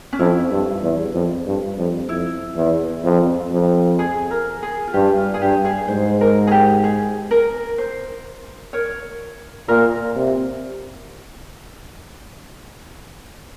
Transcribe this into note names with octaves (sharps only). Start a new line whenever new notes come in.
C#4
F2 E4
G2
E2
F2
G2
F2
F2 E4
E2
F2
F2
G#4
A#4
G#4
F4
G2 G4
F4
G#4
G2 G4
G#4
G#2 C5
A#4
G#4
G4
G#4
A#4
C5
A#4 C#5
A#2 A#4
C3